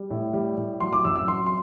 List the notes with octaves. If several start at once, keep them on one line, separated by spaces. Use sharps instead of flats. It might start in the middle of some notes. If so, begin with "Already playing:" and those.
Already playing: G3
A2
G3
A2
F#3 C6
D6
F#2 E6
E6
F#3 C6
C6